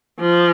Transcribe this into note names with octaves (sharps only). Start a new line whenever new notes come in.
F3